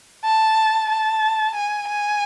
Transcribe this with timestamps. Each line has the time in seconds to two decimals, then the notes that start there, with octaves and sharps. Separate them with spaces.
0.24 A5
0.90 A5
1.55 G#5
1.88 G#5